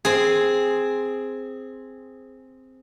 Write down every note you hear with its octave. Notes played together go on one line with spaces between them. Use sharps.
C4 G#4